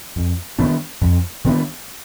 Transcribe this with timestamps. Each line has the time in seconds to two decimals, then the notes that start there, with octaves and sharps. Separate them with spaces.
0.16 F2
0.58 D#3 B3 D4
1.01 F2
1.44 D#3 B3 D4